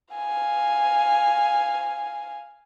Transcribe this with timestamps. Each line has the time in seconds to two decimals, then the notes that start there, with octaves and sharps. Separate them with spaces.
0.14 F5 G#5